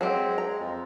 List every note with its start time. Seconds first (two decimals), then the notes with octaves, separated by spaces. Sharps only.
0.01 F#3 G#3 C4 G4
0.38 A#5
0.61 F2